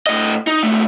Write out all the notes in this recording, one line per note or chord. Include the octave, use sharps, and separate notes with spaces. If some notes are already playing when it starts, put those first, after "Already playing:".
A2 D#5
D#4
C#2 A3